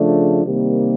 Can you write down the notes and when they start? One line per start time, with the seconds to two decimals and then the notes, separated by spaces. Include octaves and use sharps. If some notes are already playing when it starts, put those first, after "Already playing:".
Already playing: C#3 F3 A3 D4
0.44 C3 D#3 G3 A#3